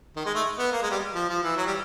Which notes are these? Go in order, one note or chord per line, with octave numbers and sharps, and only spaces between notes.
D#3
G#3
A3
B3
A#3
G#3
G3
F3
F3
E3
F#3
G3